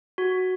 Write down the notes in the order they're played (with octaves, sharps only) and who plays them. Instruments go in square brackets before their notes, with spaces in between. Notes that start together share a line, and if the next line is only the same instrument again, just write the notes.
[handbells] F#4